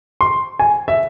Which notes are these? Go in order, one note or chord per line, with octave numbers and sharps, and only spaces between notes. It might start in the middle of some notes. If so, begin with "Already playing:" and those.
C6
G#5
E5